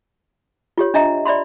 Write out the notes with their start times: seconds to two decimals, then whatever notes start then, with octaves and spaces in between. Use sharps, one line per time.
0.78 F4 G4 C#5
0.94 D4 D#5 E5 A#5
1.25 D5 E5 B5 C6